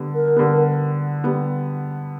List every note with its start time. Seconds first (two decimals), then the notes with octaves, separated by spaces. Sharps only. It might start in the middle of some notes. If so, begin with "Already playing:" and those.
Already playing: D3 G3 B3
0.15 A#4
0.36 D3 G3 B3
1.24 D3 G3 B3